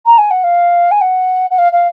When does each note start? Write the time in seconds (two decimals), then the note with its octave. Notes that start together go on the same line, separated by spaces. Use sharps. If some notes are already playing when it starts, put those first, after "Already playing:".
0.06 A#5
0.18 G#5
0.31 F#5
0.44 F5
0.91 G#5
1.01 F#5
1.51 F#5
1.58 F5
1.72 F5